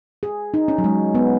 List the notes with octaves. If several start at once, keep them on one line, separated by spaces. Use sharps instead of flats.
G#4
D#4
C#4
F#3
G#3
B3